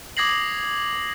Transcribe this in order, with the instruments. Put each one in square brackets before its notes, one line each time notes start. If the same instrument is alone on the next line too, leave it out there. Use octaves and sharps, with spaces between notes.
[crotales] D6 D#6 G#6 A#6 C7 F#7